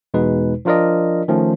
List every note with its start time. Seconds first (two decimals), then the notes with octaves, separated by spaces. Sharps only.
0.14 E2 B2 G#3 D#4 B4
0.65 F3 D4 F4 A#4 D5 D#5
1.28 D#3 F3 A3 C#4